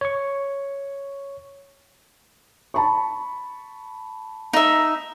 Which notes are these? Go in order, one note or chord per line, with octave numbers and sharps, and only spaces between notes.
C#5 C#6
A5 B5 C#6
D#4 E5